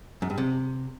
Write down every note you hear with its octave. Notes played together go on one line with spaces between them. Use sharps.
F#2
G2
C3